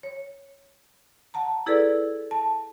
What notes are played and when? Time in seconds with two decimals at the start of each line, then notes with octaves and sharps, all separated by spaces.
0.03 C#5
1.34 F#5 A5 A#5
1.66 E4 G#4 A4 B4 D5
2.31 A5